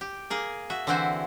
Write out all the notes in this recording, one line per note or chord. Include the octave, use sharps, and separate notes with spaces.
G4
A#3 G#4 A#4
F#4 E5
D3 E3 C4 E4 F#4 C5